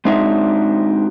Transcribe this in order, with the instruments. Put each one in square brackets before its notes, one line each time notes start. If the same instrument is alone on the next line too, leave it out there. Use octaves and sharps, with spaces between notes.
[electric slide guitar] G#3 C4 D4 D#4 F#4 E5